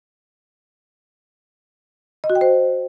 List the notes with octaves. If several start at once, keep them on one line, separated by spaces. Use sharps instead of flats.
D#5
F#4
G5
C5